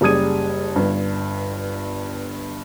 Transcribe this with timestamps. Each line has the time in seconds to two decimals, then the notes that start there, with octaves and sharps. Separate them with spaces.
0.01 F#1 G3 G#4 D#6 G#6 D#7
0.76 G1 G2